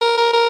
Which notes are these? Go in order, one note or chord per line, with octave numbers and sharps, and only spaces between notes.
A#4
A#4
A#4